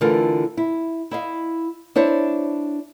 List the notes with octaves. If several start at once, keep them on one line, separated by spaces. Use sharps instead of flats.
D3 E3 A3 F4 A#4
E4
E4 D#5 F5
D4 E4 C5 C#5